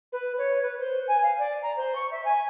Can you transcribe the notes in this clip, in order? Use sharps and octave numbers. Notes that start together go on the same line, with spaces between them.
B4
C#5
B4
C5
G#5
F5
D5
A#5
C5
C#6
E5
G#5